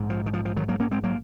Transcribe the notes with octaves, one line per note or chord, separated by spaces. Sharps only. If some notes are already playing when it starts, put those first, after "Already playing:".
Already playing: A#1 G#2
F3
D#3
F3
F3
D#3 F#3
F#3 A#3
A#3 C#4
G#3 C4
F#3 A#3